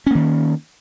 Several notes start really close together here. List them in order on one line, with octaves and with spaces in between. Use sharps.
C#4 A#3 D#3